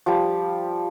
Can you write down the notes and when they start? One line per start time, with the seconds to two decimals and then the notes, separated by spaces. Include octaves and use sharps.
0.06 F3 G3